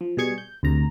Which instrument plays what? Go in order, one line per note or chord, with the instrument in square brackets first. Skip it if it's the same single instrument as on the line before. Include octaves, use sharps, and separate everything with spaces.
[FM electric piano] F3
B2 G3 G#4 C#6 G#6
G6
D2 C3 A#5